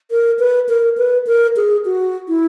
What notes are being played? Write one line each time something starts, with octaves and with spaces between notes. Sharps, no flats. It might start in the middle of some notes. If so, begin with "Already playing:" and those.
A#4
B4
A#4
B4
A#4
G#4
F#4
E4